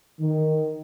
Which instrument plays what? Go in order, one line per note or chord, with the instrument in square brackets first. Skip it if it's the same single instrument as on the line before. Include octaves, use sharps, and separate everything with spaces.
[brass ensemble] D#3